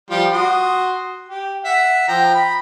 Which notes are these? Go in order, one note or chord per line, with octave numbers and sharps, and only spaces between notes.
F3 G3 F4
F#4 C6 D#6
G4
E5 F#5
F3 G5 A#5
B5